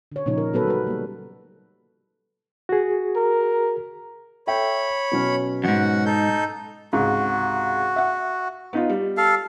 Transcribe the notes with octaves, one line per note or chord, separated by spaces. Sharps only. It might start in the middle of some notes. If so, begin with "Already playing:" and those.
D3 C#5
A#2 C#3 F3 D#4 C#5
A#4
F#3 B3 A4 B4
G3 B4
G3 A#3
F#4 G#4
A#4
A4 C#5 E5 G5 B5
B2 F#3 C#4
F2 G#2 F#4 F#5
D#4 A4 G6
C#2 G#2 C3 F#4
E5 F#5
B3 D#4 F4
G3
A4 F5